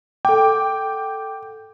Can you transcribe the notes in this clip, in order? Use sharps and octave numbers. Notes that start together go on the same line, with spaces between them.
A4 F#5 G5 D6